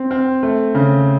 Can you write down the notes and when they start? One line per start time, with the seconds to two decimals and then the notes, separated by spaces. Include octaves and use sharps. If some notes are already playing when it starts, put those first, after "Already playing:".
Already playing: C4
0.11 C4
0.43 A3
0.75 C#3